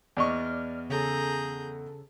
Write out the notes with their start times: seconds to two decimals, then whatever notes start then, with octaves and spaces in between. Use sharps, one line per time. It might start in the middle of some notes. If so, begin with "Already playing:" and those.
0.17 E2 D5 D#5 C#6 F6
0.89 C#3 G#4 A4 A#5 G6